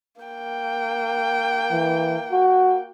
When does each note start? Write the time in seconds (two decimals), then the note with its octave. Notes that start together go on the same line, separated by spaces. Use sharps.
0.21 A#3 G5
1.71 E3
2.32 F#4